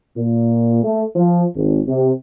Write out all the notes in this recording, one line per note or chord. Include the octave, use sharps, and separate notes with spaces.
A#2
A3
F3
G#1
C3